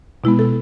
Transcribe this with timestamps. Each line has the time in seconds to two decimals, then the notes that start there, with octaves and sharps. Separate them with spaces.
0.24 B2 G#3 B3 E4
0.39 A4